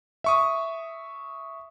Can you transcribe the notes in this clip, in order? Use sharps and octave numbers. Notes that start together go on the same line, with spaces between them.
E5 C#6 D#6